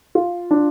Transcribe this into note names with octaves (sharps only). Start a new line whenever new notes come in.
F4
D4